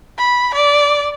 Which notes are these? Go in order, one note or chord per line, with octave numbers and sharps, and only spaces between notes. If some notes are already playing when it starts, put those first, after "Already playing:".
B5
D5